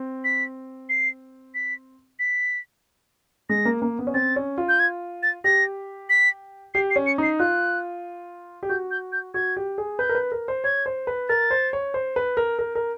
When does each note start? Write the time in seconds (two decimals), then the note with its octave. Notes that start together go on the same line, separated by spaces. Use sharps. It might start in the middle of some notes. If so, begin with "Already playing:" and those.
Already playing: C4
0.24 B6
0.89 C7
1.55 B6
2.19 B6
3.49 G#3 A#6
3.65 A#3
3.82 A#3
3.99 B3
4.07 C#4
4.14 C4 A6
4.36 C#4
4.58 F4
4.69 G6
4.80 G#6
5.23 A6
5.44 G4 A#6
6.10 B6
6.74 G4 C7
6.91 C7
6.96 C#4
7.06 C#7
7.18 D#4 C7
7.39 F4 F#6
8.63 G4
8.69 F#4 G6
8.91 G6
9.12 G6
9.34 F#4 G#6
9.57 G4
9.78 G#4
9.99 B4 G6
10.09 A#4
10.15 B4
10.32 A#4
10.48 C5
10.64 C#5 G#6
10.86 C5
11.07 B4
11.29 A#4 A6
11.51 C5
11.73 C#5
11.94 C5
12.16 B4
12.37 A#4
12.59 A#4
12.75 A#4